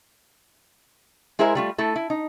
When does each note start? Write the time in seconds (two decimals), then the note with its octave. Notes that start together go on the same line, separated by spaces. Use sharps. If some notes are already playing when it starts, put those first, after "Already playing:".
1.39 G#3 E4 G#4 A#4 C5 E5
1.55 G3 A3 F4
1.78 A3 E4 A4
1.96 E4
2.10 D#4